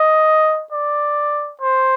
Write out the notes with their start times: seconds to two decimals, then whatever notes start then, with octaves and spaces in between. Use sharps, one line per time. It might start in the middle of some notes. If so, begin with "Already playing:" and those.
Already playing: D#5
0.72 D5
1.61 C5